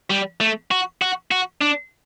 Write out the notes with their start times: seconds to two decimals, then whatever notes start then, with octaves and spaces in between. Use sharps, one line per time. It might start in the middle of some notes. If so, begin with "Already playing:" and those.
0.10 G3
0.40 A3
0.71 F#4
1.01 F#4
1.31 F#4
1.61 D4